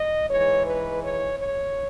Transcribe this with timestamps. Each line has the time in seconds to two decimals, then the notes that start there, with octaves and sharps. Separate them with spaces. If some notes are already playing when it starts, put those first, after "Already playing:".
Already playing: D#5
0.29 G#2 E3 G#3 C#5
0.66 B4
1.03 C#5
1.39 C#5